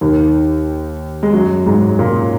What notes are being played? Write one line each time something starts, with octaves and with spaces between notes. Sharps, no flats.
D#2 D#3
G#3
F#2 F#3
G#2 G#3
A#2 A#3